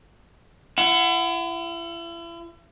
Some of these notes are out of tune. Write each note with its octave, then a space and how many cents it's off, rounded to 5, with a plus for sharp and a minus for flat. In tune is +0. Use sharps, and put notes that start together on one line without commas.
E4 +40 F#5 +0